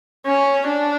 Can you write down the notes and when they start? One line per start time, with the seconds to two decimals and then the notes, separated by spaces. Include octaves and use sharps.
0.26 C#4
0.68 D4